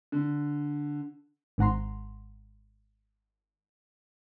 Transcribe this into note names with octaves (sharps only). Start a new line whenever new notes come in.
D3
G#1 G#2 F#5 A#5 C6